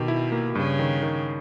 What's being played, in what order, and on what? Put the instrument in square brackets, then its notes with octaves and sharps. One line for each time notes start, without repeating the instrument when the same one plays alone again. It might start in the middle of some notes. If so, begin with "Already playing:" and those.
Already playing: [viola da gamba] B2 [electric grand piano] D#3 G4
[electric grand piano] E4
A#3
[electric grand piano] G2 [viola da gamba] C#3
[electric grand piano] D#3
D#3